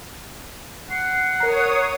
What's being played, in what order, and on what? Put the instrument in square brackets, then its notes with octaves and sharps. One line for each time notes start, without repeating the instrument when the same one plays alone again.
[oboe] F#5 [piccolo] C7
[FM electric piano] A#4 A#5 [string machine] C#5 D#6 [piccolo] C7